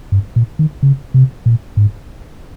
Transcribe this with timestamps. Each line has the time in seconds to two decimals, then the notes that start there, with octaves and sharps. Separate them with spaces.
0.12 G2
0.36 A#2
0.59 D#3
0.83 C#3
1.14 C3
1.46 A#2
1.77 G#2